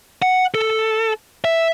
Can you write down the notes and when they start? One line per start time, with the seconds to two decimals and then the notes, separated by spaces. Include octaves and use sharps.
0.22 F#5
0.55 A4
1.45 E5